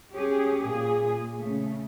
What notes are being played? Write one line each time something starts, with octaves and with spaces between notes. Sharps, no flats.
C#4 G4 G#4
A#2 G#4
C#3 A3